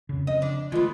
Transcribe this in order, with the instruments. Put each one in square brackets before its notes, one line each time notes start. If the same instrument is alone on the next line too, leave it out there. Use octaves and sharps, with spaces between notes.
[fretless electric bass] F2 C#3
[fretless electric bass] C#3 F3 C4 [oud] D#5
[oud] D4
[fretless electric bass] D#3 A3 [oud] G#3 B3 [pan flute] F4